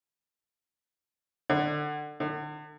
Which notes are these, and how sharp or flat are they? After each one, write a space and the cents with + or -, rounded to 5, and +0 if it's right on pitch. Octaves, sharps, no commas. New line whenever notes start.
D3 +30
D3 +45